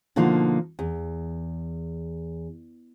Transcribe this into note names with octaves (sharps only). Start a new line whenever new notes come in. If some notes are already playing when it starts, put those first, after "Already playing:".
B2 D3 F3 A#3 D#4
E2